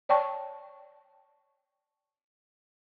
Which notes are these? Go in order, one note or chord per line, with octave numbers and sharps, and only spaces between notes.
C#5 D5 G5 A5 C#6